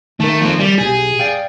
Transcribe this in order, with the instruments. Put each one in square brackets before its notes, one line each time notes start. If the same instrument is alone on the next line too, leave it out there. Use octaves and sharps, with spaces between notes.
[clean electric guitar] D#3 A#4 [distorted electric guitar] A3
[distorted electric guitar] F3 C4
G3
[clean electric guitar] B1 G4 [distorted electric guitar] G#4
[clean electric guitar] D5 F5 G5